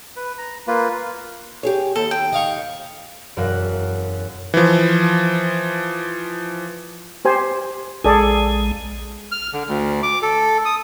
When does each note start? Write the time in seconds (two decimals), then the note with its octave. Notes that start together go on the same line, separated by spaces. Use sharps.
0.16 B4
0.38 A#5
0.67 A#3 F4 B4
1.63 G4 G#4 C#5
1.96 D#2 A4
2.11 G5
2.32 D#5 F5 C#6
3.36 E1 F#2 A#4 F5 F#6
4.54 E3 F3
7.25 G4 C5 G#5
8.04 A#1 G#3 G#4 A4 D5
9.32 F6
9.53 D3
9.68 D2
10.03 D6
10.23 A4
10.65 D#6